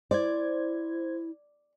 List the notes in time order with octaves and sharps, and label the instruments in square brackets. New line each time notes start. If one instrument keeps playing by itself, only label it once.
[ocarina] E4 [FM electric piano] C5 G#6 [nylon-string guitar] D5